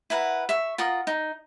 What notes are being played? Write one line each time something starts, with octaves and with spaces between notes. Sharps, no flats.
E4 A#4 B4 F#5
E5 C#6
F4 A#4 F#5 D#6
D#4